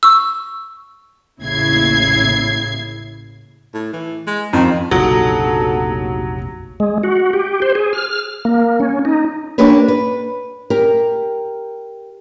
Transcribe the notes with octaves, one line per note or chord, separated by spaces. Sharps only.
C#6 E6
A1 D#2 C#3 E4 G#6 C7
A2
E3
G#3
F2 D#3
F1 A#1 C#3 F#3 A#3 D#4 G4 A4
G#3
F#4
G4
C5
G#4
F6
A#3
C#4
D#4
A#3 D4 G4 B4 C#5
B4
G4 A#4